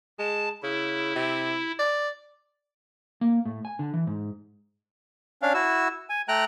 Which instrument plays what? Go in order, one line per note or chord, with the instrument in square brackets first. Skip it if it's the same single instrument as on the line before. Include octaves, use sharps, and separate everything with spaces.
[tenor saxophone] G#3 [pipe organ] A5
[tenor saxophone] C#3 [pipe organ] E4
[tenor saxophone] C3
D5
[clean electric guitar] A#3
A2
G#5
D3
E3
G#2
[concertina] C#4 D4 F5
E4 F#4 E6
G#5
A3 G5 A#5 F#6